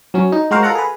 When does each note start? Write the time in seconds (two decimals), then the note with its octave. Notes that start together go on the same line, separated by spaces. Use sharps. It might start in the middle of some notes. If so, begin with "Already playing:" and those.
0.14 F#3 C#4
0.32 D#4
0.51 G#3 F#4 A#4 C5 F5
0.63 F4 A4 A#4 F#5 A#5
0.75 G#4 B4